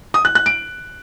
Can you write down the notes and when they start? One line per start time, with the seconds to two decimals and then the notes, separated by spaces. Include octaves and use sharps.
0.14 D#6
0.25 F#6
0.35 F#6
0.46 D7